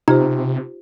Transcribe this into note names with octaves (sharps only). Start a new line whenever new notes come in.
C3 D#4 F4 G4 C5